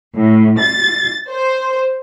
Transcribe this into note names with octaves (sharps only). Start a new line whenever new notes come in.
A2
A6
C5